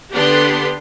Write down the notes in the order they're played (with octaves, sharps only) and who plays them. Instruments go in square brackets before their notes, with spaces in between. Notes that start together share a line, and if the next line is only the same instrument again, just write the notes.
[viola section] D3 B3 D4 G4 B4 C6